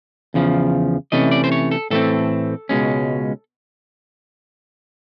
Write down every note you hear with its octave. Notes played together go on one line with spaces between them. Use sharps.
E2 C#3 F3
C3 E3 A3 C#4 D#5
D5
C5
C#5
A4
A2 E3 A3 C4 A4
C#2 B2 G#3 C#4